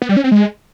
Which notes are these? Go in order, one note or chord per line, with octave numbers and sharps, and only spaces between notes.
B3
G3
C#4
C4
G#3